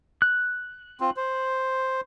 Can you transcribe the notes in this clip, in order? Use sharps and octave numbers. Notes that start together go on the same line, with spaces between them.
F#6
C4 F4
C5